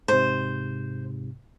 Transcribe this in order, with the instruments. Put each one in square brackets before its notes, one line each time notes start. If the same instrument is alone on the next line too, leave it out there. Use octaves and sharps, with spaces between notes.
[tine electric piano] G#2 C3 [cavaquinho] C5